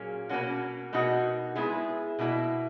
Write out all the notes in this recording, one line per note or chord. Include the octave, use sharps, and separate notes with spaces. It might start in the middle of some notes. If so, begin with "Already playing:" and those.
Already playing: A#2 F#3 A#3 C#4 G#4
B2 A#3 C#4 F#4
B2 A#3 D#4 F#4
G#3 B3 E4 G#4
B2 A#3 E4